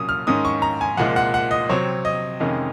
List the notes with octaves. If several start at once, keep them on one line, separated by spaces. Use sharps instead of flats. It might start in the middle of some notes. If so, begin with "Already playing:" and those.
Already playing: C2 A#2 F#3 C#4 D#6
F6
G#2 D#3 G#3 C#4 D#6
C#6
A#5
G#5
C2 A#2 F3 G#3 F#5
F#5
F#5
D#5
C3 F#3 C4 C#5
D#5
F2 C3 D#3 G#3 C#4